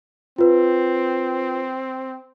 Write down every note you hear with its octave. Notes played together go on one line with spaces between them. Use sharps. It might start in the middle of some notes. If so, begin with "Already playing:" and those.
C4 F4 B4